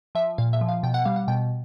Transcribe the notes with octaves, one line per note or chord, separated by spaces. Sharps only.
F3 E5
A#2 F5
E5
F3
F5
B2 G5
F#5
G3 F5
F#5
B2 G5